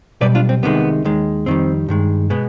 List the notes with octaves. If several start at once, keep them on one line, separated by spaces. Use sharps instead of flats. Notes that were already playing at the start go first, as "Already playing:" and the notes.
B1 B2 G3 B4 D5
D4 F4
C4
C2 C3 D#3 G#3 B3
D#2 D#3 G#3
F2 D#3 G3 C4
G2 D#3 G#3
B2 G#3 B3